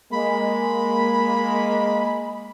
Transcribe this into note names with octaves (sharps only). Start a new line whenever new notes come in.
G#3 A#3 B5